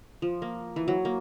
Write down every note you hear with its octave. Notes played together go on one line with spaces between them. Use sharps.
F3
A#3
E3
F#3
A#3